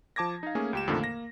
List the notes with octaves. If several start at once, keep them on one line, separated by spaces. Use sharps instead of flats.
F3 A5 D6 G#6 A#6
D#4 F5
A3 A#3 C#4 G#4
C#2 G4 E7
F2 A#2 D3 D#3 A3
A#3 A#6